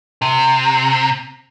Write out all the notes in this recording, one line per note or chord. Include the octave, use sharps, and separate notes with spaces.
C3